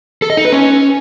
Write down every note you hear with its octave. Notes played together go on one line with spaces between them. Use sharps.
A4
D#5
D#4
B4
C#4